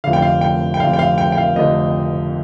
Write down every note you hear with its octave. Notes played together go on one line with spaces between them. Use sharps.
F1 F2 D3 F5
G5
F5
G5
G5
F1 F2 D3 F5
G5
F5
G5
G5
F5
F1 F2 D3 D#5